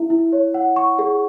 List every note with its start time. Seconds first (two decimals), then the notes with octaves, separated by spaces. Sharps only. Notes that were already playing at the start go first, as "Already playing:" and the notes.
Already playing: E4 E5
0.10 E4
0.33 C#5
0.54 F#5
0.76 C#6
0.99 G#4